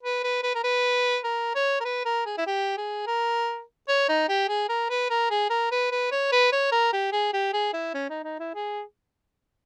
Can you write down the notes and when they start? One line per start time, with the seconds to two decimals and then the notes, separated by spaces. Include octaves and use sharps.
0.03 B4
0.23 B4
0.43 B4
0.55 A#4
0.63 B4
1.24 A#4
1.55 C#5
1.80 A#4
1.85 B4
2.05 A#4
2.26 G#4
2.37 E4
2.46 G4
2.77 G#4
3.07 A#4
3.88 C#5
4.09 D#4
4.29 G4
4.48 G#4
4.69 A#4
4.89 B4
5.10 A#4
5.30 G#4
5.50 A#4
5.71 B4
5.91 B4
6.11 C#5
6.32 B4
6.52 C#5
6.72 A#4
6.93 G4
7.12 G#4
7.33 G4
7.53 G#4
7.73 E4
7.94 C#4
8.10 D#4
8.24 D#4
8.39 E4
8.55 G#4